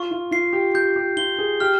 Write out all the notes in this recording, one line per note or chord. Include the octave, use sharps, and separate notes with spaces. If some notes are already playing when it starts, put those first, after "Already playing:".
Already playing: F4 C#6
F4
F4 C7
G4
G4 G6
G4
F4 G7
G#4
G4 F6